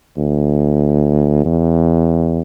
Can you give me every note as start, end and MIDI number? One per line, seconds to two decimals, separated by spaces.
0.17 1.42 38
1.45 2.42 40